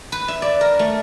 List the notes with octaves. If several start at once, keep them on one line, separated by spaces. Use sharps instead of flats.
B4
E5
D5
A#4
A3